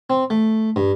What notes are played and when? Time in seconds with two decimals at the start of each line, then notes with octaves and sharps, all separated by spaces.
0.10 C4
0.30 A3
0.76 G2